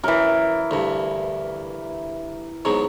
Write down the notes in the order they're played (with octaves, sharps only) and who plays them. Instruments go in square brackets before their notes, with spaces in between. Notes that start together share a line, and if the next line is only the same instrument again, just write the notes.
[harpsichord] F#2 [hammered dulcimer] E3 A#4
[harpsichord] D2 G2
G#2 B2 F#3